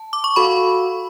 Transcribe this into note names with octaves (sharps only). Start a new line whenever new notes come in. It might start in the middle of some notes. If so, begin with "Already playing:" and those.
Already playing: A5
D6
C#6
F#4 A4 F5 B5